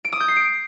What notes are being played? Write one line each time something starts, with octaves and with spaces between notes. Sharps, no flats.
D7
D#6
G6
C7
D7